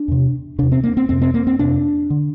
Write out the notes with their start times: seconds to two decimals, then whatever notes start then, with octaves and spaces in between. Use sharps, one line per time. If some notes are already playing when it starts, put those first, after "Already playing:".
Already playing: D4
0.08 E2 C3
0.59 E2 C3 D4
0.72 C4
0.84 A#3
0.97 C4
1.09 F2 C3 C4
1.22 C4
1.34 A#3
1.47 C4
1.59 F2 C3 D4
2.10 D3